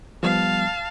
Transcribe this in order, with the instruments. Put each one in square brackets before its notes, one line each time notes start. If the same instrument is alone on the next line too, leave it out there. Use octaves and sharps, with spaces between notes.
[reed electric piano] F3 G3 B3 [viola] F5 A5